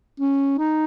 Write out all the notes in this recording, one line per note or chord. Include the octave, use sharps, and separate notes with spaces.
C#4
D#4